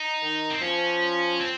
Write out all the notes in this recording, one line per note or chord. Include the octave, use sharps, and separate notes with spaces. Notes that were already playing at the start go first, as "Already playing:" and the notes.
Already playing: D#4
D#3
C4
F3 C#4
C4